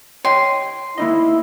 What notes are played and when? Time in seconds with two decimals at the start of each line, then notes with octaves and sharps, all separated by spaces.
0.25 C#5 D#5 G5 C6
0.98 A#3 D#4 E4 D#5